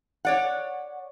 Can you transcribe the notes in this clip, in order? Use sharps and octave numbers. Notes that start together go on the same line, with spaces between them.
C#5 D5 F#5